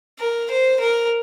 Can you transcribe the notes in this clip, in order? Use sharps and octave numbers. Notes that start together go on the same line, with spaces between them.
A#4
C5
A#4